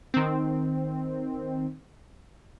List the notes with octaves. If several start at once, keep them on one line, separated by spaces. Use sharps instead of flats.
D#3 C4